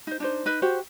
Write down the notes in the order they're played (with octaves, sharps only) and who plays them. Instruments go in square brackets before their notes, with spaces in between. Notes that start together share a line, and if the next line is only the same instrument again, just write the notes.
[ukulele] D#4 C5
D4 D#4 C5
D#4 B4
F#4 G4 C5